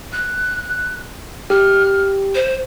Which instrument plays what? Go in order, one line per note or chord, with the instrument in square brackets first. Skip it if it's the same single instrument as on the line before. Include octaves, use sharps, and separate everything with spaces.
[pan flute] F#6
[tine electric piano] G4 [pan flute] F6
[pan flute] C5